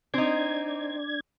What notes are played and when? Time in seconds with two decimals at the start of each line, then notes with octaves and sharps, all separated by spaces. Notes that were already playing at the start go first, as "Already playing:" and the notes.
0.14 C4 D4 D#4 G#6